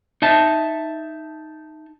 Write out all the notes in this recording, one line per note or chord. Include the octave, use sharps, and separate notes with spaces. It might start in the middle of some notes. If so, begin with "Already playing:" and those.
D#4 E5 A5